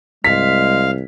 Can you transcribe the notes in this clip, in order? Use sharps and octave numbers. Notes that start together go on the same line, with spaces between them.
C2 G#3 F5 B6